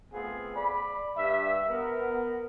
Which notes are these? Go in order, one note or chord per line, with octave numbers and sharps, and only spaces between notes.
A3 B3 C4 F4 G#4
D5 B5
G2 E5
B3 A#4